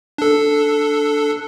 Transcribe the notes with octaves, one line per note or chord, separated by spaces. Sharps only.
D4 A4